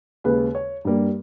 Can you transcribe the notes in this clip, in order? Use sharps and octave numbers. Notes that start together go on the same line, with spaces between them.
D#2 C#3 G#3 B4
C#5
G2 G3 A#3